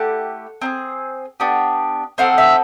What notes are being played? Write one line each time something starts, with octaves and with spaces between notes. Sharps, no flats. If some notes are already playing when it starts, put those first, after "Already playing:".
Already playing: A3 E4 G4 F#5
C4 D#4 G#4
B3 D4 G4
C4 D#4 F#4 A4 F5
E5